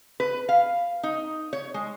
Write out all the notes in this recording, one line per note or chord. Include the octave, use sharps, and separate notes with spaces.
B4
F5
D#4
C#5
G#3